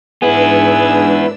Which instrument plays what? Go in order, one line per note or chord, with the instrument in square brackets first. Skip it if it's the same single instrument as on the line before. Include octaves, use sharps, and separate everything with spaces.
[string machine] G#2 D4 E6 [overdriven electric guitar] B3 E4 [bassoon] G#4 [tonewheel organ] B4